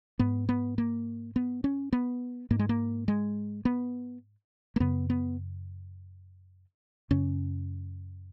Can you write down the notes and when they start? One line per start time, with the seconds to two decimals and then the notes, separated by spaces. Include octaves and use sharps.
0.19 G#2 B3
0.49 B3
0.78 A#3
1.36 B3
1.64 C#4
1.93 B3
2.51 G#2 A#3
2.59 G#3
2.69 A#3
3.08 G#3
3.65 B3
4.76 A#3
4.80 F#2 C#3 B3
5.10 B3
7.11 F#2 C#3 C#4